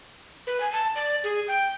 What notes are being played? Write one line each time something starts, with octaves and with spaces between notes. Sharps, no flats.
B4
G#5
A5
D5
G#4
G5